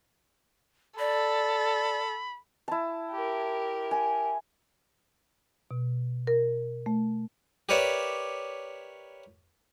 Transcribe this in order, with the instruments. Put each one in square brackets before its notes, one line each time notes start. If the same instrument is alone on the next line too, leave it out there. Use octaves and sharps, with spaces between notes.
[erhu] A4 [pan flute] D5 [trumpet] B5
[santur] E4 A5
[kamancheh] G4 A#4
[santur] G#5
[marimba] B2
A#4
A3
[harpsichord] G4 A#4 B4 C#5 D5 E5